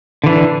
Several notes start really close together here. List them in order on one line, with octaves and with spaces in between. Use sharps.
D3 E3 D4